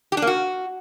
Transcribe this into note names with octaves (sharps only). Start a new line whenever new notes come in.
G4
D4
A#3
F#4